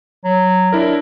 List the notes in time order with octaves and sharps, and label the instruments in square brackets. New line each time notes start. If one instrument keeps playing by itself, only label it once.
[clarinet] F#3
[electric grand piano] D4 E4 A#4